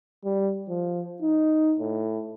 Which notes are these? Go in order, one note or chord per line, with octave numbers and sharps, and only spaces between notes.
G3
F3
D#4
A2